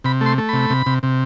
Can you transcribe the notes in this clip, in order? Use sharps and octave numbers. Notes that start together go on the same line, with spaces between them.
C3 B5
A3
C6
A3
C3 B5
C3
C3
C3